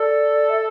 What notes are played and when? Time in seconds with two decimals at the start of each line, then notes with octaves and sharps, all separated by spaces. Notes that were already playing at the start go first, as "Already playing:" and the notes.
Already playing: A4 D5
0.50 E5